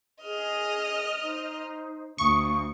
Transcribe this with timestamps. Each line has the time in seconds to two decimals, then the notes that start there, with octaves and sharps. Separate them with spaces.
0.22 G#4 D#5 F6
1.22 D#4 C5
2.18 D2 F5 C#6 D#6